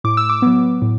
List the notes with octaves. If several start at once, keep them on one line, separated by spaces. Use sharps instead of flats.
A2 D6
E6
D6
F#3 B3
A2